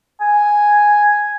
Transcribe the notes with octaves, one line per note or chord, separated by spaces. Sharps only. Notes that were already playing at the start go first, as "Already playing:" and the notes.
G#5